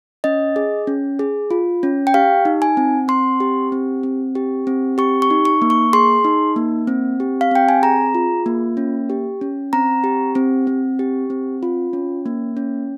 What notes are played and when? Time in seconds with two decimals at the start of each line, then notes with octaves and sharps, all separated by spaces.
0.24 C#4 D#5
0.56 G#4
0.87 C#4
1.19 G#4
1.51 F4
1.83 C#4
2.07 G5
2.14 G4 F5
2.45 D#4
2.62 G#5
2.77 C4
3.08 C4 C6
3.40 G4
3.72 C4
4.03 C4
4.35 G4
4.67 C4
4.98 G4 C#6
5.22 C#6
5.30 D#4
5.45 C#6
5.62 A#3
5.70 C#6
5.93 G#4 C6
6.24 D#4
6.56 A#3
6.87 C4
7.20 G4
7.41 F5
7.51 C4 G5
7.69 G#5
7.82 G#4 A#5
8.15 F4
8.46 A#3
8.77 C#4
9.10 G4
9.41 C#4
9.73 C4 A#5
10.04 G4
10.35 C4
10.67 C4
10.99 G4
11.30 C4
11.63 F4
11.93 C#4
12.26 A#3
12.57 C#4